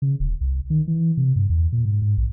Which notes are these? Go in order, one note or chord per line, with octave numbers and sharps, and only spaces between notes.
C#3
D#1
C2
D#3
E3
C3
G2
E2
A#2
G#2
G#2
A#1